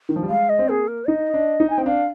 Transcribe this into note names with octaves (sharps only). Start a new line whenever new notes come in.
D#3
F3
G3
G#3 F5
D#5
C4
A#3 G#4
A#4
D#4 D#5
D4
D#4
G#5
C4 G5
D4 F5